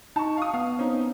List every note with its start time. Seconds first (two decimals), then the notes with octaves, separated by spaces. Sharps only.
0.16 D#4 A5 C#6
0.37 F5 C#6 D#6
0.54 B3 F5
0.78 C4 C#4 D#4